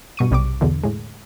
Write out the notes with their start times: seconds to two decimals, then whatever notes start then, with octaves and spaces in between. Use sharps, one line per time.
0.17 G2 B2 C#6 D#7
0.31 B1 C3 G3 C4 D6
0.61 E2 B2 D3 E3
0.84 A2 G#3